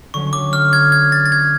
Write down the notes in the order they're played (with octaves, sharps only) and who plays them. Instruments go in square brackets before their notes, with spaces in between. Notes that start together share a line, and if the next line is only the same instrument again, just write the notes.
[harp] D3 F#3 C#4 [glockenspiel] C#6
[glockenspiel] D6
F6
G#6
G#6
A6
A6
G#6